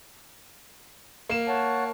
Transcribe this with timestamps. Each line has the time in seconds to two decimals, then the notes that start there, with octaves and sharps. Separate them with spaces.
1.30 A#3 E7
1.48 C#5 F#5 A5